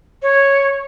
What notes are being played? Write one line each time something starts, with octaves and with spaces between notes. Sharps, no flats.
C#5